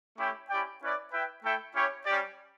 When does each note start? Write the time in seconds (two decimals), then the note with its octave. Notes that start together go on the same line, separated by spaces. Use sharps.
0.18 A3 C#4 E4 G4
0.50 C#4 E4 G4 D5 G5
0.81 C#4 E4 B4 D5
1.12 E4 B4 E5 G5
1.43 A3 E4 A4 E5 G5
1.75 C#4 E4 G4 C#5
2.06 G3 C#4 G4 D5